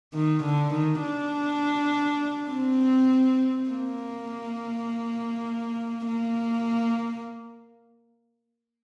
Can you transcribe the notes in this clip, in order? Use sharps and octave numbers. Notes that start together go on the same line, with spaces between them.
D#3
D3
D#3
D4
C4
A#3
A#3